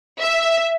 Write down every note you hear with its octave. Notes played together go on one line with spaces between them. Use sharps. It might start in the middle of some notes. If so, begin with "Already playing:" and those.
E5